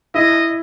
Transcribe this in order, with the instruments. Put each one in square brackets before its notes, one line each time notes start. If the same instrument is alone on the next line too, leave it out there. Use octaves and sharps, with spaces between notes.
[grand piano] E4 [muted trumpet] D#5